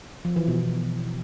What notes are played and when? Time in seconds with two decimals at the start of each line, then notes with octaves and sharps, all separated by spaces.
0.25 F3
0.36 E3
0.48 B2
0.59 F3